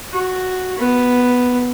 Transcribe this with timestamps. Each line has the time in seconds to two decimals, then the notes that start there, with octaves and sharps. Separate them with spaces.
0.12 F#4
0.78 B3